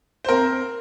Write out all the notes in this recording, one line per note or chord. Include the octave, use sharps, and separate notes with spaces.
C5
C4 A#4